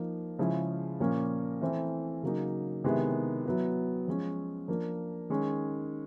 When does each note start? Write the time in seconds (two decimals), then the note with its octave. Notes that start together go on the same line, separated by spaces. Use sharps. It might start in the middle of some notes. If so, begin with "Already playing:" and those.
Already playing: F3 A#3 D#4
0.39 C#3 F3 G#3 C#4 E4
1.00 A#2 F3 A#3 C#4
1.61 E3 A3 C4 E4
2.23 C#3 F#3 A#3 D#4
2.84 C3 D#3 G#3 B3 E4
3.45 F#3 B3 E4
4.07 F3 G#3 C#4
4.68 F3 A#3 D4
5.30 D#3 G#3 C#4